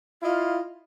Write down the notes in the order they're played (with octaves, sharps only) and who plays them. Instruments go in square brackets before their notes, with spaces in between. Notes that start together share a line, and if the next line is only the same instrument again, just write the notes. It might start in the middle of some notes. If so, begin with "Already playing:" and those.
[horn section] E4 D#5 F5 [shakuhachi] F4